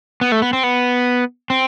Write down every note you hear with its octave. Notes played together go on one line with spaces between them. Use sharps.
B3
A3
B3
C4
B3
C4